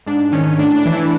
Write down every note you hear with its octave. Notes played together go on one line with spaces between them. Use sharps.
G#2 D4
D#3 C#4
A2 D4
D4
E3
E4